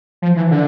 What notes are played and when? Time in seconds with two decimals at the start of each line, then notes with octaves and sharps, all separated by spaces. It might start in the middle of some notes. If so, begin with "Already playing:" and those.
0.22 F3
0.36 E3
0.51 D3